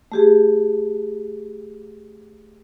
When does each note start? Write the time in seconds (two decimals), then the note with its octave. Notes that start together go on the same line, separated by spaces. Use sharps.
0.12 A3 G4 G#4